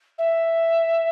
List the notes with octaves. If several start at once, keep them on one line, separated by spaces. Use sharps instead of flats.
E5